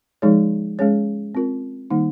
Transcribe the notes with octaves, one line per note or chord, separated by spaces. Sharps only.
F3 G#3 D#4 G#4 C#5
G#3 C#4 G#4 C#5
C4 F4 A#4
D#3 G3 A#3 D#4